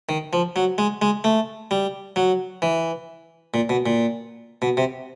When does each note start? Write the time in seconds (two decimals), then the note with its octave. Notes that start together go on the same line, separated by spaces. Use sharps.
0.09 D#3
0.33 F3
0.56 F#3
0.78 G#3
1.02 G#3
1.24 A3
1.71 G3
2.16 F#3
2.62 E3
3.54 A#2
3.69 B2
3.86 A#2
4.62 B2
4.77 C3